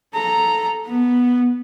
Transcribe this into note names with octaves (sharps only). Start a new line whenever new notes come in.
A4 A#5
B3